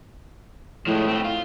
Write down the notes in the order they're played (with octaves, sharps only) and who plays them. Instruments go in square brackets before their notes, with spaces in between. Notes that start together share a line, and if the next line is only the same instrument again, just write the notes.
[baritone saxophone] A2 [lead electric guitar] F3 G#3
[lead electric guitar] A3 C4
F4